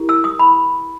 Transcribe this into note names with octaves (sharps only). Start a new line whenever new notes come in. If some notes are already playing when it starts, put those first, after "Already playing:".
Already playing: E4 G4 A#4
E6
D#6
B5